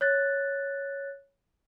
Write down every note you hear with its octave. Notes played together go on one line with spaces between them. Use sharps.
C#5 F#6 A6